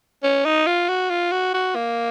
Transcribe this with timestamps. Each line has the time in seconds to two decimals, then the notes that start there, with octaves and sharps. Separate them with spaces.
0.23 C#4
0.45 D#4
0.67 F4
0.89 F#4
1.10 F4
1.32 F#4
1.54 F#4
1.75 A#3